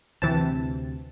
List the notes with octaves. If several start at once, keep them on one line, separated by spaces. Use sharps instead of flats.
D2 C3 E3 C4 A5